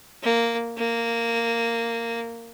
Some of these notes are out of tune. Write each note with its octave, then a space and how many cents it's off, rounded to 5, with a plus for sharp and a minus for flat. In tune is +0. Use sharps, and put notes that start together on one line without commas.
A#3 -5
A#3 -10